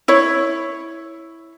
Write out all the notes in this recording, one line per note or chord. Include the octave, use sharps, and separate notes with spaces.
E4 C#5